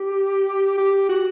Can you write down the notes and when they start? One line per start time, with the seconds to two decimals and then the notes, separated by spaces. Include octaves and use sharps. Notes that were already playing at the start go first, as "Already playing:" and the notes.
Already playing: G4
0.78 G4
1.09 F#4